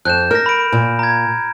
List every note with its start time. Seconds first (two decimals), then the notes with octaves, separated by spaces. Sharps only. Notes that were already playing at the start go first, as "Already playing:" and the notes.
0.05 F2 F#6 G6 E7
0.31 A#4 F6 A#6
0.46 B5 D7
0.72 A#2
0.99 A#5 G#6